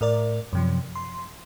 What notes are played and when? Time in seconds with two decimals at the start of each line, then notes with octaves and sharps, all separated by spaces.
0.01 A2 A#4 D5
0.53 F#2 C3 F3
0.95 C6